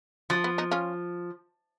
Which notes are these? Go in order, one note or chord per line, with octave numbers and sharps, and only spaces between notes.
F3 F#3
B3
B3 D#4
C#4 F4